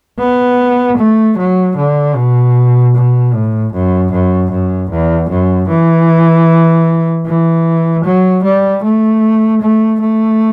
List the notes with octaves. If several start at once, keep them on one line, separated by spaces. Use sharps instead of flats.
B3
A3
F#3
D3
B2
B2
A2
F#2
F#2
F#2
E2
F#2
E3
E3
F#3
G3
A3
A3
A3